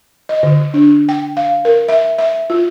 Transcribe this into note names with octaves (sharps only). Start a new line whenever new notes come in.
D#5
D3
D4
G5
F5
A#4
E5
E5
F4